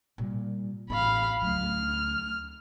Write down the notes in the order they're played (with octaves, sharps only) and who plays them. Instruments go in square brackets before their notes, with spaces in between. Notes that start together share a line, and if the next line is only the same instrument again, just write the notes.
[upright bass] A#2 G3
[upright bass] A1 B3 [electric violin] F5 B5
[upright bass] D2 F#3 [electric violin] F6